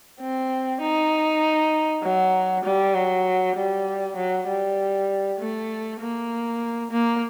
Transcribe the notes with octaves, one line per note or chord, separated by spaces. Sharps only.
C4
D#4
F#3
G3
F#3
G3
F#3
G3
A3
A#3
A#3